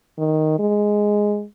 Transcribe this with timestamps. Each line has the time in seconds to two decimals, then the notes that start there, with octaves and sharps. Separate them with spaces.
0.18 D#3
0.59 G#3